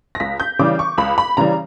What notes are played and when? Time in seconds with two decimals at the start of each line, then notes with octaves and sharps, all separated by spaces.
0.15 A#6
0.20 C#2 B6
0.40 G6
0.59 C#3 E3 G3 D6
0.79 C#6
0.98 C#2 B5
1.18 B5
1.37 C#3 E3 G3 A#5